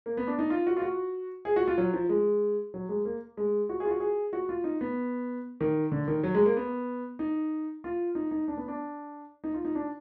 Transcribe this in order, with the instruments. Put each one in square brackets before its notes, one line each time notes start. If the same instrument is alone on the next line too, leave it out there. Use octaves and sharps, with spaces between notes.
[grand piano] A#3
B3
D4
D#4
F4
F#4
F4
F#4
G#4
F#4
F4
F#3
F3
G#3
F#3
G#3
A#3
G#3
F#4
G#4
F4
F#4
G#4
F#4
F4
D#4
B3
D#3
D3
D#3
F#3
G#3
A#3
B3
D#4
F4
D#4
D#4
D4
B3
D4
D#4
F4
D#4
D4